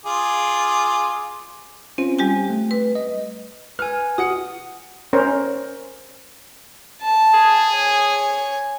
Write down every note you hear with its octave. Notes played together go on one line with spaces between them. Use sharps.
F4 G#4 D6
C4 C#4 F4 C5
G3 G4 G#5
A3
B4
D#5
B4 G#5 F6
F#4 F#5 D#6 C#7
C#4 A#4 C5
A5
G#4
C#5 G#5